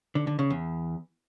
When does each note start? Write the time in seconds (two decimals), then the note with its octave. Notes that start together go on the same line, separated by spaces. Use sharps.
0.15 D3
0.27 D3
0.39 C#3
0.50 E2